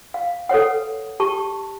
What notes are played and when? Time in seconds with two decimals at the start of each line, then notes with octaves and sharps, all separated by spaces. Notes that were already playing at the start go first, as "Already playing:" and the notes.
0.14 F5
0.49 A4 B4 C#5 F#5
1.20 G4 A5 C#6